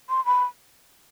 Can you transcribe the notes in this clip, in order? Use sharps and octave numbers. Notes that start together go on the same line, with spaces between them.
C6
B5